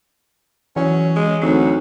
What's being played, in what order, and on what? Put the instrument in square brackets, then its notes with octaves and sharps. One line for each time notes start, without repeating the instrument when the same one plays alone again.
[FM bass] E3 [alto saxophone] F#3 [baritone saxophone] C#4
[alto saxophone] G#3
[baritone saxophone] D2 [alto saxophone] F#3 [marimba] C4 D#4